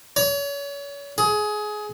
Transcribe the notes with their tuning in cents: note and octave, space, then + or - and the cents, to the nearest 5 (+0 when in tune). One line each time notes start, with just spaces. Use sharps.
C#5 +35
G#4 +20